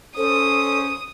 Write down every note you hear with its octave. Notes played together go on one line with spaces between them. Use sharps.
C#4 A4 C5 D#6